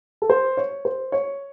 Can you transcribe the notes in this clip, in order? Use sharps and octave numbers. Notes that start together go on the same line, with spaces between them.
A4
C5
C#5
C5
C#5